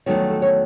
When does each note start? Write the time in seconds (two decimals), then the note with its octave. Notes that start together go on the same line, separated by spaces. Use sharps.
0.06 E2 D#3 F#3 A3 C#5
0.30 A4
0.42 C#5